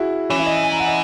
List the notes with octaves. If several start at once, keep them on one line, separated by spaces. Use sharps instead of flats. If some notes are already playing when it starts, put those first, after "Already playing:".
Already playing: E4 F#4 G#4
E3 C#4
E4
D#5
E5
G#5
A#5
F#5
D#5